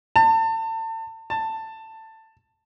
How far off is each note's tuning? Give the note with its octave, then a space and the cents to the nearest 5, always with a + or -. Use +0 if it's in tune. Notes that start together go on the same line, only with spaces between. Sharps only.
A5 +35
A5 +15